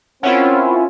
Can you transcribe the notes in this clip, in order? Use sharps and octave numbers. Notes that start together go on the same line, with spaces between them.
C4 C#4 E4 F4 A#4 C#5 F#5